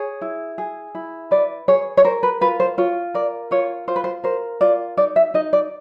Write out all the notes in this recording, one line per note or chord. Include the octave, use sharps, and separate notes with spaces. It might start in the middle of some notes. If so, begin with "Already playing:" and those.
Already playing: G#4 C#5
E4
G#4
E4
B4 D5
G#4 C#5
C#5
A#4 C5
B4
F4 B4
C5
F4 C#5
A#4 D5
F4 C#5
F4 C5
B4
C5
A#4 C5
F4 D5
D#4 D5
E5
D#4 D#5
D5